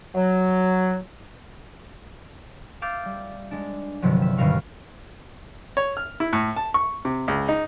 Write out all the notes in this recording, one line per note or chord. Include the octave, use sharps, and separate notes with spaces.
F#3
E5 F5 D6 G6 A6
G3
G#3 D4
G1 G2 C3 D#3 F3 F#3
E5
G1 B2 D#3 A#4 F5 C#6
C#5
F6
E4
A2
A5
C#6
C3
C#2
D#4